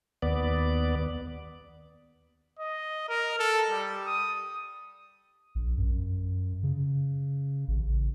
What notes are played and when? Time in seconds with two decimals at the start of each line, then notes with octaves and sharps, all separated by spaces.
0.22 D#2 B3 D5
2.60 D#5
3.09 A#4
3.39 A4
3.71 G3
4.06 D#6
5.55 A#1
5.77 F#2
6.63 C#3
7.68 A1